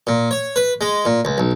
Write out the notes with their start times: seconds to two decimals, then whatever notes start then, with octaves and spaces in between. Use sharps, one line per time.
0.07 A#2
0.31 C#5
0.56 B4
0.81 G#3
1.05 A#2
1.25 C#2
1.38 B1